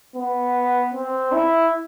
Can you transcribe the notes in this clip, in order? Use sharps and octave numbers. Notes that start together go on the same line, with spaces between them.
B3
C4
E4